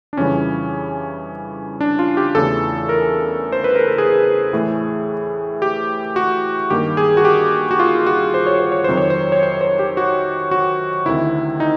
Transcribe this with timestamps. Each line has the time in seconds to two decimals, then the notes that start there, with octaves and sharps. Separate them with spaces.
0.13 D4
0.17 F2 C#3 E3 G3 C#4
1.81 D4
1.99 F4
2.17 G4
2.35 E2 C#3 E3 A3 A4
2.89 A#4
3.52 C5
3.64 B4
3.75 A#4
3.87 A4
3.98 G#4
4.53 A2 E3 A3
5.62 G4
6.16 F#4
6.70 G2 D#3 G3 A#3 G4
6.97 G#4
7.17 F#4
7.25 G4
7.71 F#4
7.80 F4
8.07 F#4
8.34 C5
8.47 C#5
8.60 C5
8.72 C#5
8.84 F2 C3 D#3 F#3 C5
8.97 C#5
9.10 C5
9.32 C#5
9.43 C5
9.61 C5
9.79 G4
9.97 F#4
10.51 F#4
11.06 D2 C3 D#3 E4
11.60 D#4